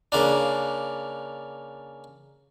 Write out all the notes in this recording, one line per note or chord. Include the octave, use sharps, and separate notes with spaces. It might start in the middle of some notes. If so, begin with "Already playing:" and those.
C#3 A#3 D4